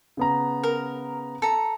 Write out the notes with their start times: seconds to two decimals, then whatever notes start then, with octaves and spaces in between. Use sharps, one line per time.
0.17 C#3 B3 A#5
0.63 A#4
1.42 A4 A#5